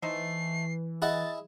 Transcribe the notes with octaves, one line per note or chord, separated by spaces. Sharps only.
E3 A3 D#4 C5 C7
E4 G#4 D#5 F#5 A6